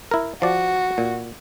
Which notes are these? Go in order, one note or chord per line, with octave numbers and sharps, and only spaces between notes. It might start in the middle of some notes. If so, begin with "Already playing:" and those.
E4 A#4
F3 F#4 D5
A#2